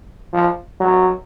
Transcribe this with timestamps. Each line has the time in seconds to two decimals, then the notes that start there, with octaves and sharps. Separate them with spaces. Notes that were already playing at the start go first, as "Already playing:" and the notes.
0.33 F3
0.80 F#3